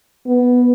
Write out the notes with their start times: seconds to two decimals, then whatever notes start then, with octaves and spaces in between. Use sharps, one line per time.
0.27 B3